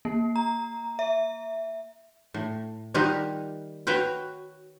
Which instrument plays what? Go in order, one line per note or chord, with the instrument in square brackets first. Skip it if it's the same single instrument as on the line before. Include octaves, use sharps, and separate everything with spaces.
[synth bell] A#3
A#5
E5
[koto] A2
D#3 G3 D#4 F4 G4 F#5
F#4 B4 C#5 F#5 G5